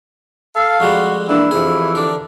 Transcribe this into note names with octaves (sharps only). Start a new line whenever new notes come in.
A4 F5
F2 G3 G#3 F#4
E3 A#3 D4 E4
F2 C3 E3 G#4
D3 D4 A#4